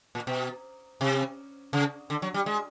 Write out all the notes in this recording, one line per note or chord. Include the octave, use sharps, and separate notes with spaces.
A#2
B2
C3
C#3
D3
F#3
G3
G#3